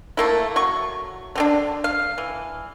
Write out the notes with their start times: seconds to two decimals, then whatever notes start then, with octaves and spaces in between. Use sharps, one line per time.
0.17 A3 A#3 E4
0.56 F#3 C#6
1.35 D3 C4 D4
1.84 F5
2.18 E3